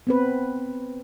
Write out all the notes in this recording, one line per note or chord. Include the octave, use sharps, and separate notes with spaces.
B3 C4 B4